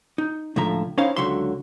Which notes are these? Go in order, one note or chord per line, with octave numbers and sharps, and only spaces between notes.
D#4
C#2 A2 D3 F3 E5 A#5
C#4 D#4 E4 C5 C#5 F5
C#2 D3 F#3 E5 C6